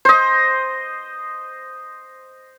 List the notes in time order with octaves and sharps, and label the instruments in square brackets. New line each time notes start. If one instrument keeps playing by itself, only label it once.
[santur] C5 D#5